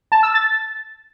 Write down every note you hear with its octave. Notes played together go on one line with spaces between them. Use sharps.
A5
E6
A6